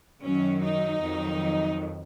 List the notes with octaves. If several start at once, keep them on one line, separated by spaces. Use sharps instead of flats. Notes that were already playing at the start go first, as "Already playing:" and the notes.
F#2 D#3 F#3 C#4
D#4
F2 D#3 F#3